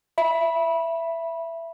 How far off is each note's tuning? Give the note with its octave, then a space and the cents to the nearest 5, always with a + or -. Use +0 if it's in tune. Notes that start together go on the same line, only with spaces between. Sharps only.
E5 +15 B5 -20